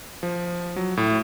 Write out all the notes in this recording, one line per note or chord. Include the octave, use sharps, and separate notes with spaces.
F3
F#3
A2